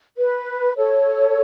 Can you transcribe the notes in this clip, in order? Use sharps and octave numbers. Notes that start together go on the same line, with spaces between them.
B4
A4 C#5